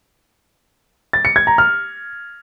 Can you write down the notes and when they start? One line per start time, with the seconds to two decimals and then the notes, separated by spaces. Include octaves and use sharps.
1.13 A6
1.25 C#7
1.36 G#6
1.47 A#5
1.58 F6